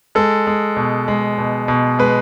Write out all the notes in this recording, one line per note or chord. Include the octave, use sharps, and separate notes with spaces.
G#3 A4
G#3
B2
G#3
B2
B2
G#3 B4